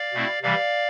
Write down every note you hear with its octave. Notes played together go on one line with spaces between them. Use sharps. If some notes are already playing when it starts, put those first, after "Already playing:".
Already playing: D5 F5
B2 A3 C4 E4
C3 E3 G3 D5 F5